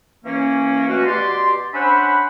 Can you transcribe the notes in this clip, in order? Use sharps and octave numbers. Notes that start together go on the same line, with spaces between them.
E3 A#3 C#4
B2 E3 A3 C#4 F#4
B2 G4 D5 C6
C#4 D4 C5 E5 F#5 B5